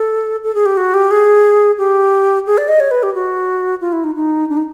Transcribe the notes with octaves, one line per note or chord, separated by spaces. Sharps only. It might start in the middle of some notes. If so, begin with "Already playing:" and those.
Already playing: A4
A4
G#4
G4
F#4
G4
G#4
G4
G#4
D5
D#5
C#5
B4
G4
F#4
F4
E4
D#4
D#4
D4
D#4